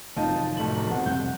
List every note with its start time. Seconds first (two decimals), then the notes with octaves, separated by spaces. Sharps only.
0.16 F1 F#2 D#3 D#4 F4 D#5 A5
0.57 D1 A3 F#7
0.76 A#5
0.90 B2 E3 C4 F#5
1.06 F2 C3 G3 G6